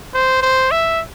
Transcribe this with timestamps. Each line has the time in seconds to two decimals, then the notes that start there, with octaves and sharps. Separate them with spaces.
0.14 C5
0.42 C5
0.71 E5